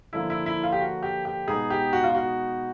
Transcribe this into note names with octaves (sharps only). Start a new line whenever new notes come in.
D3 F3 A#3 E4
E4
E4
F4
G4
F#4
G4
G4
B2 G#3 B3 D#4 G#4
G4
F#4
F4
F#4